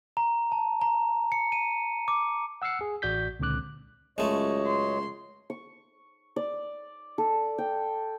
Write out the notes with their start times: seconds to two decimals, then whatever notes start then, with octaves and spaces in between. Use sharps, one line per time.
0.17 A#5
0.52 A5
0.81 A#5
1.32 C#7
1.52 D#7
2.08 D6
2.62 F#5 E6 F6 C7 C#7
2.81 G#4
3.02 A1 F#4 D5 G6 B6
3.40 C#2 A#2 D3 C4 D6 F#6
4.18 C#2 F#2 G#3 A3 C#5 D#5
4.67 C6
5.50 C#6
6.36 D5
7.18 A4
7.58 G5